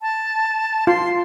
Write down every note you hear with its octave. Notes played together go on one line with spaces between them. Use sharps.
A5
F4 C6